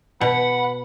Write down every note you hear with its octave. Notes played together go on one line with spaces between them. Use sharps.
B2 F#5 B5